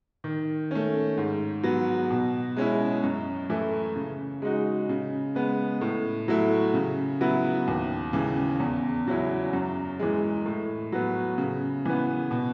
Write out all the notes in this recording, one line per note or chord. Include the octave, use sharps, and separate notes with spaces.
D#3
A3 C#4
G#2
F#3 B3
B2
G#3 C#4 E4
F#2
E3 A3 E4
C#3
G#3 D#4 F#4
C#3
G#3 B3
A2
F#3 A3 E4
C#3
F#3 B3 E4
D#2
C#3 E3
E2
C#3 F#3 C#4 E4
F#2
E3 G#3
A2
F#3 B3
C#3
E3 B3
B2